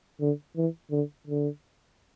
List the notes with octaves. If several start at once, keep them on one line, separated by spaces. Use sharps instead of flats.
D3
E3
D3
D3